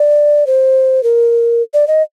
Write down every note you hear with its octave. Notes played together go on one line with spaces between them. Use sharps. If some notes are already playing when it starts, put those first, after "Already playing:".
Already playing: D5
C5
A#4
D5
D#5